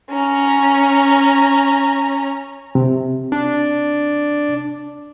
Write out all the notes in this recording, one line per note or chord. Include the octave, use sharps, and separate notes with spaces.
C#4 A#5
C3
D4